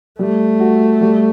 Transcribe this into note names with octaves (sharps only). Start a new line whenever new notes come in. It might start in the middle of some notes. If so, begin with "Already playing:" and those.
G3 A3
F#4
G3